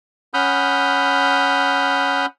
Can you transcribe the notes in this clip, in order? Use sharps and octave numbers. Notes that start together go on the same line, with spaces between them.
C#4 F#5 B5 D#6 F6 G6